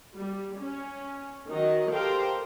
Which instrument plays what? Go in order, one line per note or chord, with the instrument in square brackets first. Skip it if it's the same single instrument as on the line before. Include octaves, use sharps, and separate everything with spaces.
[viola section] G3
C#4
D#3 F#3 D#5
G4 A4 A#4 C5 F5 G5